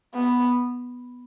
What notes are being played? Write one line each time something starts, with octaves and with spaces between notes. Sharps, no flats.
B3